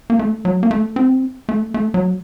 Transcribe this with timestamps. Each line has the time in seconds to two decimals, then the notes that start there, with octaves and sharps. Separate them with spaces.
0.10 A#3
0.19 A3
0.45 F#3
0.63 A#3
0.71 A3
0.96 C4
1.49 A3
1.74 A3
1.94 F#3